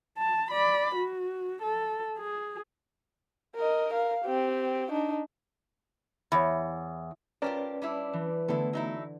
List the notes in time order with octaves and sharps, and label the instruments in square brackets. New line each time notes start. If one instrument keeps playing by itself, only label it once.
[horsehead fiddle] A5
D5 B5
F#4
A4
G#4
[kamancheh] A#4 D#5
A#4 F5
C4 G4
D4 D#4
[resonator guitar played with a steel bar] E2 [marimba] C#5 B5
[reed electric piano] C#4 B4 D5 [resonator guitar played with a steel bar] F4 G4 A#4 [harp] A5
[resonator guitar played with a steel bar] G3 D4 E4
[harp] E3
[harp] D3 [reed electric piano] E3 A3 B3 [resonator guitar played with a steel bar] E4 A4
[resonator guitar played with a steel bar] F#3 D#4 E4